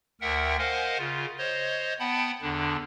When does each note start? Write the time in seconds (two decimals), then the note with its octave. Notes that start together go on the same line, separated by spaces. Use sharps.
0.21 D2 A#4 E5 F#5 G5
0.59 A#4 C5 D#5 F5 F#5 G#5
0.98 C#3 F4
1.38 C5 C#5 D#5
1.99 B3 F#5 G5 A5 B5
2.42 E2 D3 D4